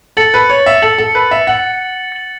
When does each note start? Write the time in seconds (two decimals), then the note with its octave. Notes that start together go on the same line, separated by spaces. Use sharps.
0.17 A4 A6 C#7 F#7
0.34 B4
0.50 C#5
0.66 E5
0.82 A4 A6 C#7 F#7
0.98 A4
1.15 B4
1.31 E5
1.47 F#5 A6 F#7
2.12 A6 F#7